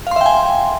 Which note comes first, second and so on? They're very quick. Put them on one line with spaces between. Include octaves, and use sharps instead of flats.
F5 C6 E5 G5 G#5